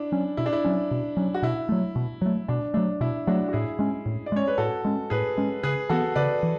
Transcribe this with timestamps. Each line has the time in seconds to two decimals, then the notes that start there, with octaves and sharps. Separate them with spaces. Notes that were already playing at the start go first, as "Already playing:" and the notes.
Already playing: D4 E4
0.12 F#3 C#4
0.37 B2 E4
0.46 D4
0.53 E4
0.65 F#3 C#4
0.91 B2
1.17 F#3 C#4
1.34 F#4
1.42 B2 E4
1.69 F#3 A3
1.96 B2
2.22 F#3 A3
2.48 B2 D4
2.74 F#3 A3 D4
3.00 B2 E4
3.27 F#3 A3 D4 F#4
3.48 F#4
3.53 A2 E4 G#4
3.79 G#3 C#4
4.06 A2
4.26 D5
4.32 G#3 C#4 C#5
4.48 B4
4.58 A2 F#4 A4
4.85 G#3 C#4
5.10 A2 G#4 B4
5.38 G#3 C#4
5.63 C#3 G#4 B4
5.89 E3 B3 F#4 A4
6.16 C#3 B4 D5
6.43 E3